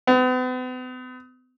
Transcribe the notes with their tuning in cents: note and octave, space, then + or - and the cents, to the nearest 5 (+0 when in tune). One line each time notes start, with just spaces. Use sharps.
B3 +45